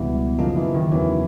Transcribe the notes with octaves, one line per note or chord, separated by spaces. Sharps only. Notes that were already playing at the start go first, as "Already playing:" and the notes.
Already playing: C#2 B2 E3 G3 B3
F#2 C#3 F3 F#3 A#3 D#4
E3
D#3
E2 C#3 E3 F#3